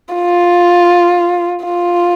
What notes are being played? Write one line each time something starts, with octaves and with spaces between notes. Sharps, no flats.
F4
F4